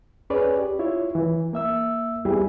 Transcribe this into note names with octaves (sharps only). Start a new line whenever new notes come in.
C#4 G#4 B4 C#5 D5
G4
E4 F4 C#5
E3
A#3 E5 E6
G3 B3 E4 G4 G#4